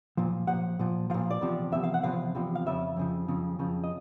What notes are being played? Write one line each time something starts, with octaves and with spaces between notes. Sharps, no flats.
A#2 F3
A#2 F3 F#5
A#2 F3
A#2 F3 F5
D5
E2 C3 F3
E2 C3 F3 E5
F5
F#5
E2 C3 F3 F5
E2 C3 F3
F5
F2 C#3 F3 E5
F2 C#3 F3
F2 C#3 F3
F2 C#3 F3
D#5